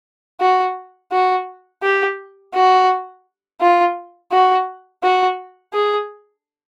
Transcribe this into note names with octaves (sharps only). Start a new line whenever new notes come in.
F#4
F#4
G4
F#4
F4
F#4
F#4
G#4